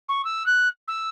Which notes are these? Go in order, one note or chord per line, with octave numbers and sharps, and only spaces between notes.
C#6
E6
F#6
E6